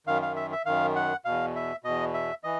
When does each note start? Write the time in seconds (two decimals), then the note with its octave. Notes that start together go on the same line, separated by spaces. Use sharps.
0.07 F#2 D#3 F5
0.22 F5
0.36 E5
0.52 E5
0.66 F#2 D#3 F5
0.96 F#5
1.25 E2 B2 F5
1.55 E5
1.84 E2 B2 D#5
2.14 E5
2.44 E3 D#5